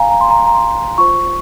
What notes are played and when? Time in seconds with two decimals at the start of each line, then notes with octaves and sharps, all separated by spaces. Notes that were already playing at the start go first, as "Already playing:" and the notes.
Already playing: F5 G#5 A#5
0.11 A#5
0.21 C6
0.31 A#5
0.47 A#5
0.55 C6
0.98 F4 C5 C#6